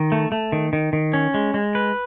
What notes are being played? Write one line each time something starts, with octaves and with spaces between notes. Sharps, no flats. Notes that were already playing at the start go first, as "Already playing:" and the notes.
Already playing: D#3
A3
A3
D#3
D#3
D#3
C#4
G#3
G#3
B4